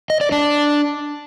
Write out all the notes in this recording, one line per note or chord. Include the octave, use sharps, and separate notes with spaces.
D#5
D5
D4